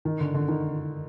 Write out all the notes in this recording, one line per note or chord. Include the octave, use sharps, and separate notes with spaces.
D#3
D3
D3
D#3